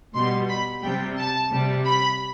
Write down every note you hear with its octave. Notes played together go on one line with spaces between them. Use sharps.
B2 G3 C6
B5
C3 G3 G5
A5
C3 G3
B5